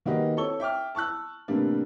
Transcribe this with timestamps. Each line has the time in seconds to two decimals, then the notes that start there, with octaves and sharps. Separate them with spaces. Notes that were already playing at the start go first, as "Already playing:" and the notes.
0.06 D#3 A#3 F#4 G4 B4 D#5
0.37 C4 A4 C#5 C#6 E6 G7
0.60 E5 G5 D6 F6
0.95 A5 C#6 E6 F#6
1.48 A2 C3 E3 G3 A#3 D4